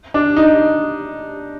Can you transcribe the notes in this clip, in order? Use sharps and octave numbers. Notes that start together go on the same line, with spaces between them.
D4
D#4